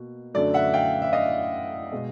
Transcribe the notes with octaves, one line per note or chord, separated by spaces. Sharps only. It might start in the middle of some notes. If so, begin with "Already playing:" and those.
Already playing: B2 A#3
F#2 D3 F#3 A3 D5
E5 F#5
F5 G5
E5
D#5 F5
B2 G#3